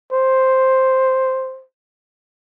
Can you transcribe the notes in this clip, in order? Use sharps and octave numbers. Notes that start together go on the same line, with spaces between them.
C5